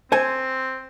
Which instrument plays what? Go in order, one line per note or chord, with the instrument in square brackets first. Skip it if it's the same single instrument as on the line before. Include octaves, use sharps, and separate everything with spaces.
[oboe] C4 [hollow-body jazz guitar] C5 G#5